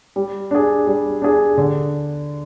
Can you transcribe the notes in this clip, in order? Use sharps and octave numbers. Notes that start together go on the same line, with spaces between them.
G3
D4 G#4
G3
D4 G#4
D3